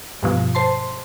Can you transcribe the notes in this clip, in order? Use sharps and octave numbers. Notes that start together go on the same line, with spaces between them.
G2 B2 F3
C5 A5 C6